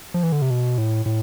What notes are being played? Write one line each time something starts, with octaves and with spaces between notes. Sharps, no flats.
F3
E3
D3
C3
B2
A2
A2